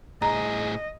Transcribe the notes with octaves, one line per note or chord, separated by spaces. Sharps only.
A2 G#4 D#5 A#5